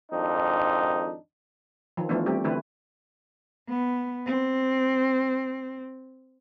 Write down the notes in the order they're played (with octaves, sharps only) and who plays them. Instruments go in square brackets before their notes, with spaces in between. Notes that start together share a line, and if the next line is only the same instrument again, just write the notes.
[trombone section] G#1 F2 D4 D#4
[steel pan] D#3 F3
E3 F3 A3 B3 D4
G3 A3 C4 G4
D3 E3 A3 C4 E4 B4
[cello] B3
C4